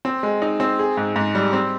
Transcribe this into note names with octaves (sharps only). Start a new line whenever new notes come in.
C4
G#3
D#4
C4
G#4
G#2
G#2
G3
C4